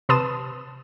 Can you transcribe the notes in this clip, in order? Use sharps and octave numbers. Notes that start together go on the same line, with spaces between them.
C3 B4 A5 C6 D#6 E7